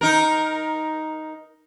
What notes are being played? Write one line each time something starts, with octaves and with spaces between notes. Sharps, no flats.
D#4 A#4